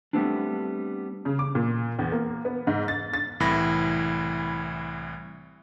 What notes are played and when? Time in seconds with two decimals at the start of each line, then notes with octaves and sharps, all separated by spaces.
0.13 G3 A3 B3 C4 D4
1.25 C#3
1.39 D6
1.55 A#2
1.99 E2
2.12 A#3
2.45 B3
2.67 G#2
2.88 A6
3.13 A6
3.40 C2 A2 E3 B5 A#6